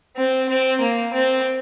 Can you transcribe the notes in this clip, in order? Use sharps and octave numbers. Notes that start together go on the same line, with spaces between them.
C4
C4
A#3
C4